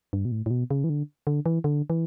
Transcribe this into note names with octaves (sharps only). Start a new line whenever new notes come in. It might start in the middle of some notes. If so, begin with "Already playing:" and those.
G2
B2
A2
A2
B2
C#3
E3
D3
D3
E3
D3
E3